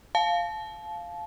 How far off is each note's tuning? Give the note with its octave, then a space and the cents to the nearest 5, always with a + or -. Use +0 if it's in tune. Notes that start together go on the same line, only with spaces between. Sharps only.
F5 +0 A5 -30